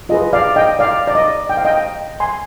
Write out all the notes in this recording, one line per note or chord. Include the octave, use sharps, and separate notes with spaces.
F4 G#4 B4 D#5
D5 F5
D#5 G5
D5 F5
D5
D#5
G5
F5
D#5 G5
G#5 C6